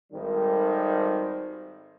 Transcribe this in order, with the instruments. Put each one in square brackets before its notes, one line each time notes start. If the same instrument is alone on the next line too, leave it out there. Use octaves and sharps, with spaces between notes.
[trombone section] G#1 D#3 G3 A4 C5